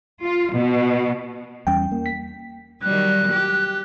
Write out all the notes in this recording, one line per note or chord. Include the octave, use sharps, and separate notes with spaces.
F4
B2
E2 G3 C#4 G5
A#3
B6
D#3 F#3 G3 F#6
G4